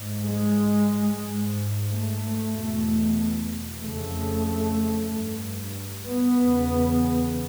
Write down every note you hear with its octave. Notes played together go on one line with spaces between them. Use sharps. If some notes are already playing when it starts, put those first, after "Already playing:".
Already playing: G#2
G#3
G#2
A3
E2 B2
F2 C#3 A3
G2
B3
E2 C#3